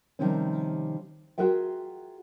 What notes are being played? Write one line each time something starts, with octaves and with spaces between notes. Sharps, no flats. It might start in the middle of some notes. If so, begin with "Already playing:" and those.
C3 D#3 F3 G3 C4 C#4
F4 F#4 G#4 A#4 E5 G5